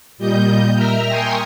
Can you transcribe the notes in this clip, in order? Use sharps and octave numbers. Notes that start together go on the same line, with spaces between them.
A#2 G3 D#5 G6
A#4 E5 A#5 F6
G5 G#5 A#5 C6 C#6 D#6